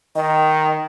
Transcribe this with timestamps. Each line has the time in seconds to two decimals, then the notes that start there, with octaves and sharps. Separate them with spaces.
0.16 D#3 D#5